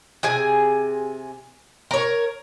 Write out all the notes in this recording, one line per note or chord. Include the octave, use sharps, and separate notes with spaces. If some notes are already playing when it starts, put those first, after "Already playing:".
C3 G#4 G#5
A#4 C#5